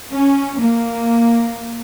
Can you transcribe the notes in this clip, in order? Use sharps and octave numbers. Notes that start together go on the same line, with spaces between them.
C#4
A#3